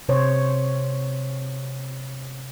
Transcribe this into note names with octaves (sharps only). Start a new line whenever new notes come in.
C3 C5 C#5